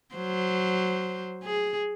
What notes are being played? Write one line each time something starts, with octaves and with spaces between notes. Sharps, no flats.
F#3 C5
G#4